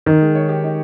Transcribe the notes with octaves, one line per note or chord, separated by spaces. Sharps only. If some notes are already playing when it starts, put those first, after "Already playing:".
D#3 D#4
G#3
C#5
G4
D#4